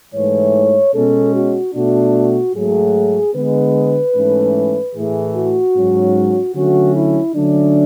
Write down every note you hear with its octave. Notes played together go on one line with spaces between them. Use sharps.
G#2 E3 A3 C#5
B2 G#3 C#4 A4
F#4
B2 A3 D4 F#4
G#2 F#3 A3 G#4
D3 G#3 B3 B4
G#2 E3 A3 C#4
A2 E3 A3 G#4
F#4
G#2 F#3 C#4
D3 F#3 A3 C#4 F#4
E4
D3 F#3 A3 C#4 D4